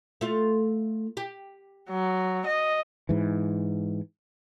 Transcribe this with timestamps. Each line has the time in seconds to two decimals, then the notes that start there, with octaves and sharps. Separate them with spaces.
0.21 A3 F4
1.17 G4
1.90 F#3
2.46 D#5
3.09 G#2 E3